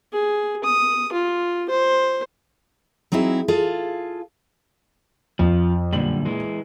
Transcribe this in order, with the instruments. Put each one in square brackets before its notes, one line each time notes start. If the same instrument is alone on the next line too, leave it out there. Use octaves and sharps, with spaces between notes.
[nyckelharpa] G#4
D#6
F4
C5
[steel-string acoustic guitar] F#3 C4 D#4 E4 G#4
F4 G#4 A4 F5
[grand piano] F2 [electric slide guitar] F3
[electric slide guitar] F#2 D3 G3 [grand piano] A#2 D5 F#7
[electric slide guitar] E3 G#3